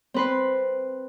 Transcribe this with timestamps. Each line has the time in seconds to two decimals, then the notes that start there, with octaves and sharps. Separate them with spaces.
0.14 C4 B4 C6